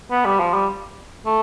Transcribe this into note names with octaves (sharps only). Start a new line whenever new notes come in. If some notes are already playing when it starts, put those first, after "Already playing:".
B3
G3
F3
G3
A3